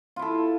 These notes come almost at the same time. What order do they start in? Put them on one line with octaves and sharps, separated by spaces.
F4 E4 A4